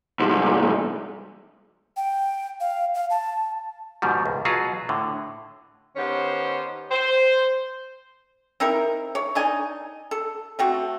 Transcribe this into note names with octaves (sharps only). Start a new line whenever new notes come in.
C2 G#2
G5
F5
F5
A5
G#2 B2 D#3 F3 G3
C#2
B2 F#3 F4 F#4 G#4 B4
A2 D3
D#3 B3 C#4 G4 C5
C5
C4 D#4 E4 A#4
C#5
D4 D#4 G#5
A4
A3 C4 F#4